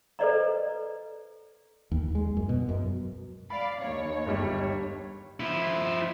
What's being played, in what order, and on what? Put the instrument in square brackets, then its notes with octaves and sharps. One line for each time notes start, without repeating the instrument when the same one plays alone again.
[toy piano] A4 B4 C5 D5 D#5 A#5
[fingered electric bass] D#2
G#3
F#2
B2
F#2
[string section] D5 F5 [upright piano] B5
[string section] D#2 C#5
[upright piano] G1 G3
[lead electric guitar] F3 E4